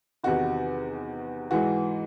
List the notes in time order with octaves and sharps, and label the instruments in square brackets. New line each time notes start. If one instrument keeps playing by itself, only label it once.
[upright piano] E2 C3 D#3 F#4
G#2 E3 F#4